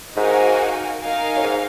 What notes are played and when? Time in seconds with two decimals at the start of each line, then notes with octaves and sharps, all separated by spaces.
0.17 G#2 D#4 F#4 A#4 F5 G#5
1.01 D#4 A#4 F5 G#5
1.36 F#2
1.43 G#2